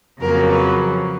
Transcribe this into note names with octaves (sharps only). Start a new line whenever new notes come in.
F2 C#3 F#3 A#3 A#4
B4